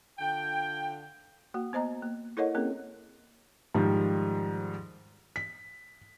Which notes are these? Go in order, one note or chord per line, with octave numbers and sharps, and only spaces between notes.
D3 F4 G5
A#3 F#4 F#5
B3 C5 D#5 A#5
A#3
E4 A4 A#4 C#5 D#5 F#5
A#3 C4 C#4 G#4 A#4
G#2 D#3 F3 G3
B6